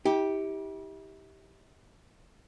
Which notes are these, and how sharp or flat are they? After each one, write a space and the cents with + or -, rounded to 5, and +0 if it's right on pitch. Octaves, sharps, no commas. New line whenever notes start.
E4 -45 G4 +0